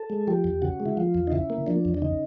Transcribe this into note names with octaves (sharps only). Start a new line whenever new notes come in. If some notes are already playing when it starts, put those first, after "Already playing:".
Already playing: A4
G#3
F3 G4
E2
C#3 F#4
G#3
E4
F3 F4
E2
D#4
C#3 E4
A#3
F3 D4
E2
D4
C#3 D#4